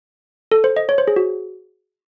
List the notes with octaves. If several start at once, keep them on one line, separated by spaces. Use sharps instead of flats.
A4
C5
D#5
C#5
C5
G#4
F#4